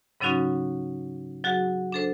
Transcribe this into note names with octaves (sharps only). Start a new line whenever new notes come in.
G#2 C#3 F#3 C#4 D#4 F#4
F#3 F#4 G#4
D4 A4 C5